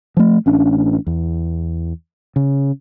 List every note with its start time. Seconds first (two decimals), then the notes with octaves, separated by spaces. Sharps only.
0.17 F3 A3
0.46 A1 C#4 D4
1.07 E2
2.36 C#3